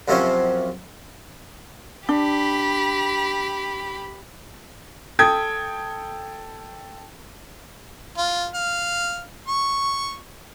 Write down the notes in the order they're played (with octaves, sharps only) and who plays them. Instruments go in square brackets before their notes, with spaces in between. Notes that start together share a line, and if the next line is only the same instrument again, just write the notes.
[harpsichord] F#2 C3 F3 C#4 C5 C#5
[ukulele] D4 [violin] G4 B5
[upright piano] A4 G5 D#6 G#6
[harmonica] F4
F5
C#6